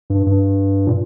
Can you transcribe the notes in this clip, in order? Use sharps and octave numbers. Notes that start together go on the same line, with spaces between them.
G2
G2
A#2